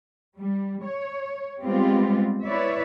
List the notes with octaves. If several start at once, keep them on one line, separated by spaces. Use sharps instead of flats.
G3
C#5
G3 G#3 B3 C4 F4 G4
E4 B4 C#5 D5 E5